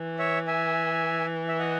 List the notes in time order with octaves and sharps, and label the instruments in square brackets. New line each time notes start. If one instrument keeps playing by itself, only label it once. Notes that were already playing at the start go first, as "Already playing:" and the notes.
Already playing: [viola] E3
[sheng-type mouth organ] C#5 E5
E5 G#5
E5
D#5 F#5